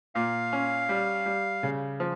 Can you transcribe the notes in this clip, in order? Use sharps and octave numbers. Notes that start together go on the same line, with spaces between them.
A#2 F5
C#4
G3
G3
C#3
F3